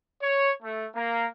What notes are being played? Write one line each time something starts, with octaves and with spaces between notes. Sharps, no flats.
C#5
A3
A#3